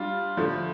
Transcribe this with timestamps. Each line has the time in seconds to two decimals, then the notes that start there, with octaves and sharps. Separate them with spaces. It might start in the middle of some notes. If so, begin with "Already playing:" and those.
Already playing: G3 D4 F4
0.37 D3 F3 A3